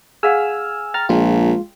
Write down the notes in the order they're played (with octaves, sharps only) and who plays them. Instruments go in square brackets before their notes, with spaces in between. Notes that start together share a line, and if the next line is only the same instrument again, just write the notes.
[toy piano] G#4 F5 F#5 [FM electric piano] G#5 E6 F6
[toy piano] G5 [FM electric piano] A#5 F6 A6
[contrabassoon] A#1 [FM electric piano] G#3 F4